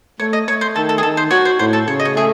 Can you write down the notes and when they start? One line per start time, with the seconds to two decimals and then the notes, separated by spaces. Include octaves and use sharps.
0.20 A3 C#5
0.33 D#5
0.48 A3 C#5
0.61 C5
0.75 D#3 A4
0.89 A4
0.98 G#4
1.03 D#3 A4
1.17 C5
1.31 F#4 C#5
1.45 C5
1.59 A2 C5
1.73 A4
1.86 C#3 C#5
2.00 D#5
2.05 C#5
2.15 A3 G#4